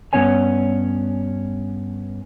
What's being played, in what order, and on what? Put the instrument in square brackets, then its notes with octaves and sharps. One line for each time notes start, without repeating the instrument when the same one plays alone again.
[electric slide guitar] G2 E3 B3 C#4 C#5 G#5